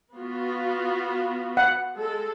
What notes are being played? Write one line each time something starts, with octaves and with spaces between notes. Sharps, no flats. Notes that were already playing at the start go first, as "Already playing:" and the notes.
B3 F4 F#4
F#5
G#3 A4